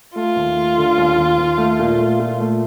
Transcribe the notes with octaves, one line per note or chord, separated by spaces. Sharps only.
A3 F4
D#2
A3
D3
D#2
D#2
D#2
A3
A#2
A3
A#2
A3